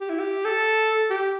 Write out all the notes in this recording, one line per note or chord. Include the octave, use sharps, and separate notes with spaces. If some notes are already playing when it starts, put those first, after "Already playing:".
G4
E4
G4
A4
G4